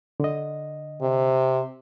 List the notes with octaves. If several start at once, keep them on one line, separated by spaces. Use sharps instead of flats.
D3 D#5
C3